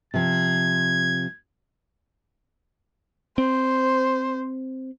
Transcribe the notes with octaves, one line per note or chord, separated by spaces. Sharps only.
C3 F3 G#6
C4 C5